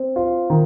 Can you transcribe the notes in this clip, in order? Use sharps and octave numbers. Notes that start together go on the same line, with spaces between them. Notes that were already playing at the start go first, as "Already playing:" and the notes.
Already playing: C4
F4
D#3